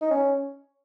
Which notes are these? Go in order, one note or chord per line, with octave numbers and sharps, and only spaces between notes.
D#4
C#4